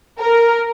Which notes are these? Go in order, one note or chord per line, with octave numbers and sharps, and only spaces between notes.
A#4